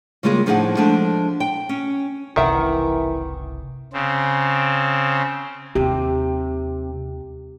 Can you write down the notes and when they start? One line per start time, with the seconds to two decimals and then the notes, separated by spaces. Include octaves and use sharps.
0.23 C#3 G3 G#3 A#3 F4 G#4
0.46 A2 F3 D4 D#4 G#4 F#5
0.77 F3 G#3 A3 D4
1.40 G5
1.69 C#4
2.36 F#1 C2 C3 D#3 E3 A#4 E5 F#5
3.93 C#3 C4
5.75 D#2 C3 D#4 G4